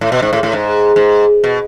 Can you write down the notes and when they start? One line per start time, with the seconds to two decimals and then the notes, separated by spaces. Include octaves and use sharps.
0.01 A2
0.12 B2
0.22 G#2
0.33 A2
0.43 A2
0.53 G#2
0.96 G#2
1.44 B2